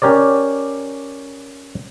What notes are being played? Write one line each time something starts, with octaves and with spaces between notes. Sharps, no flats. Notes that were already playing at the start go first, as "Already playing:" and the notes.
C#4 G4 A#4 C#5 D5